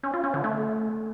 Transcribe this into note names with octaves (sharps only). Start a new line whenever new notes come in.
C#4
F4
C#4
D3
A3